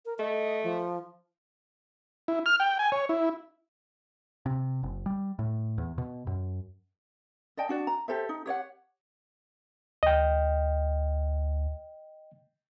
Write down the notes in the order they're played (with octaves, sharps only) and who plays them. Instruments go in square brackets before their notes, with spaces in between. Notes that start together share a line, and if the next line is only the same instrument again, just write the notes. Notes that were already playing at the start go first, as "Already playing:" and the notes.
[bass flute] A#4
[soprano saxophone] A3 [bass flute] D#5
[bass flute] F3
[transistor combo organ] E4
F6
G5
G#5
C#5
E4
[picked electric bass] C3
F#1
G3
A2
E2
B2
F#2
[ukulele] D5 D#5 G5 A5
D4 F#4 D5
A#5
G4 A4 C5 E5
D#4
G4 C#5 D5 F#5
[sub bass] D2 [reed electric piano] D#5 G5